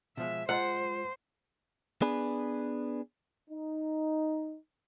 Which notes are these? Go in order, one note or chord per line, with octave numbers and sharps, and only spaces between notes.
B2 F3 G#3 E5
G#3 F4 C5 F#5 A#5
B3 D4 G#4 B4
D#4